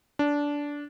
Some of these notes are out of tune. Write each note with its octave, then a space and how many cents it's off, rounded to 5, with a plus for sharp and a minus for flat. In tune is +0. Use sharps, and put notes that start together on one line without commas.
D4 -15